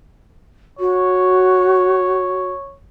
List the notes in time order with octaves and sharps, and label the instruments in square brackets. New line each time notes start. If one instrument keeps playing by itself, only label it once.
[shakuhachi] F#4 [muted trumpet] C#5